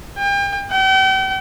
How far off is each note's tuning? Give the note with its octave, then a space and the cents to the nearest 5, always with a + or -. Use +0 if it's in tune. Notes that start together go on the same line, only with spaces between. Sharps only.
G5 +35
G5 -40